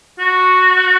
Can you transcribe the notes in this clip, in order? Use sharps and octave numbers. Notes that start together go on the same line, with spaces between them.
F#4